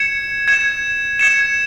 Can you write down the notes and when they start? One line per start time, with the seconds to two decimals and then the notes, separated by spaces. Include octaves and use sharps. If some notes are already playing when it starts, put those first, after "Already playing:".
Already playing: G#6 C#7 E7
0.48 G#6 C#7 E7
1.19 G#6 C#7 E7